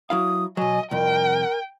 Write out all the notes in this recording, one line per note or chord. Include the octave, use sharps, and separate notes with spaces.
F#3 E4 F5 D#6
B2 F#3 D#5 G#5
C2 F2 A#4 G5